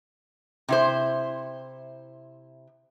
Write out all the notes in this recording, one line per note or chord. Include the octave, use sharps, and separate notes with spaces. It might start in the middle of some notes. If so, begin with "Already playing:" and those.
C3 E4 C5